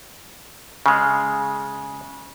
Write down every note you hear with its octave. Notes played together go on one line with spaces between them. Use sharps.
C#3 G#3